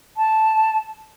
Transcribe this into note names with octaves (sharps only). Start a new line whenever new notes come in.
A5